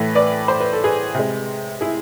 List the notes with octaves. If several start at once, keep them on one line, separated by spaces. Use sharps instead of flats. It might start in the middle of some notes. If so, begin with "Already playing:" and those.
Already playing: A2 E3 A3 B4
B4 D5
C5
B4
A4
G#4 B4
C3 G#3
E4 G#4